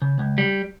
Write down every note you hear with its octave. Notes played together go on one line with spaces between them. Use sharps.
C#3
C#2
G3